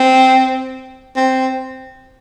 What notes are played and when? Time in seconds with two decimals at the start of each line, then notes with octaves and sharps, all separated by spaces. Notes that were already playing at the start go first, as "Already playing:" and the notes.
Already playing: C4
1.16 C4